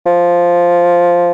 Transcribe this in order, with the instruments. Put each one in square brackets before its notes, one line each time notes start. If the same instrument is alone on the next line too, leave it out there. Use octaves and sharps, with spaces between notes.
[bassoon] F3